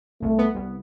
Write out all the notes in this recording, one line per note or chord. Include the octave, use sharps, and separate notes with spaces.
C2 A3
B3
C2